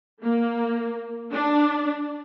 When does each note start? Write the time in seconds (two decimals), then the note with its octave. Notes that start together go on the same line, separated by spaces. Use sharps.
0.22 A#3
1.32 D4